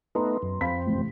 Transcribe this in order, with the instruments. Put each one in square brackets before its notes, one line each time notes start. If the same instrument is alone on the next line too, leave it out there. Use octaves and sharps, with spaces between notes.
[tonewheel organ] A3 B3 D#4 [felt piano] B4 A#5 C6
[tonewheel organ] F#2
[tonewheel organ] F2 C4 [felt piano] F5 B5 B6
[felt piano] A1 C3